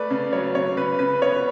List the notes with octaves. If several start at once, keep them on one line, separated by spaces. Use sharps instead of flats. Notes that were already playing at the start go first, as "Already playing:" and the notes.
Already playing: A3 B4 D5
C#3
F#3 C#5
C#3 C#5
C#3 B4
C#3 B4
B3 C#5